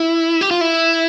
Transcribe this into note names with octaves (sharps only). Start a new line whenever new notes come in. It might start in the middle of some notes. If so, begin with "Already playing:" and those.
Already playing: E4
G4
F4
E4